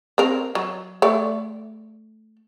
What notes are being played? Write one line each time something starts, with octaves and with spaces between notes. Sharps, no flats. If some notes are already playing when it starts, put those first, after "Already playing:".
C4 A#4
F#3
A3 D5